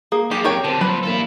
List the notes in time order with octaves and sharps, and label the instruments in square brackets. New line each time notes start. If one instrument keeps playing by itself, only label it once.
[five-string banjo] A#3 [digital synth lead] G#4
[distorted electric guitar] F#2 A#3 [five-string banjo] G4
[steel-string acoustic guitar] C4 A#4 [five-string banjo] G4 C#5 G5
[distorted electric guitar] A#2 D3 [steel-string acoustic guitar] C4 C5 [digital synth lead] A5
[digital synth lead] F#3 [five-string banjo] B4
[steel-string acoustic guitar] G2 E3 A#3 [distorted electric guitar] E4 A4